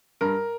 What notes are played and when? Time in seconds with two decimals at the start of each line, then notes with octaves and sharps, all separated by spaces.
0.21 G2 A#4